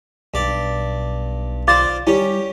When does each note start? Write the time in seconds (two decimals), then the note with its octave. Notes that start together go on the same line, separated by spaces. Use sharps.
0.34 B1 G2 D5
1.67 F4 C5 D5 F5 D6 A6
2.07 G3 C#4 E4 G4